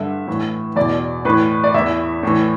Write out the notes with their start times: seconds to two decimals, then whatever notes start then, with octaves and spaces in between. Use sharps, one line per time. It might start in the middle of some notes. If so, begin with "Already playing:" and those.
Already playing: G2 D3 E5
0.27 A2 E3
0.76 E2 B2 D5
1.25 A2 E3 B4
1.64 D5
1.74 E2 E3 E5
2.23 A2 E3